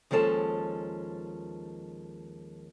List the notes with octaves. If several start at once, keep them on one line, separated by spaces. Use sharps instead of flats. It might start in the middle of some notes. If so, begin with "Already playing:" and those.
D#2 F3 G#3 C#4 A4 A5